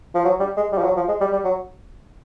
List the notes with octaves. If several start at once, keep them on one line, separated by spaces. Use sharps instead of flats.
F3
F#3
G3
G#3
G3
F3
F#3
F3
G#3
G3
G3
F#3